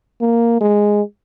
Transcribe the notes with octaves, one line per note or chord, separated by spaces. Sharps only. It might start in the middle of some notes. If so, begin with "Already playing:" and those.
A#3
G#3